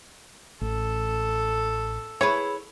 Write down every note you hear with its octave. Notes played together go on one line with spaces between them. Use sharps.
A1 A4
E4 G#4 B4 C#5